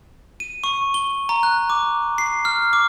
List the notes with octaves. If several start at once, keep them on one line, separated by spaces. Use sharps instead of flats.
D#7
C#6
G7
A#5
F#6
D6
C7
F6
D6